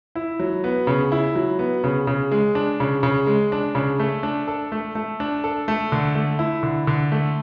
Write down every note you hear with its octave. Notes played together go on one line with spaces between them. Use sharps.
E4
F#3
B3
C#3
E4
F#3
B3
C#3
C#3
G#3
D4
C#3
C#3
G#3
D4
C#3
A3
D4
A4
A3
A3
D4
A4
A3
D3
A3
E4
D3
D3
A3